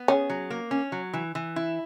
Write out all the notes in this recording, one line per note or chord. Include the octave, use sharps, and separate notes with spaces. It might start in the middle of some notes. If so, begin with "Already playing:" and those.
Already playing: B3
C#4 G#4
F#3
A#3
C#4
F#3
E3
E3
E4